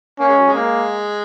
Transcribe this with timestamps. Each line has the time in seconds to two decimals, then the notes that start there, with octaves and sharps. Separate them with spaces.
0.19 A#3 C#4
0.28 G#3
0.38 F#3
0.48 G#3
0.54 A#3